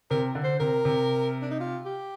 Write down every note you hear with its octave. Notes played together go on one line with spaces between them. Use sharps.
C3 A#4
D3
C5
C3 A#4
C3
D4
D#4
F4
G4